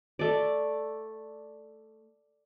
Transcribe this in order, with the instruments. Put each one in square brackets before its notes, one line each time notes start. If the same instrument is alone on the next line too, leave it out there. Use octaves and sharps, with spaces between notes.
[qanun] A3 D5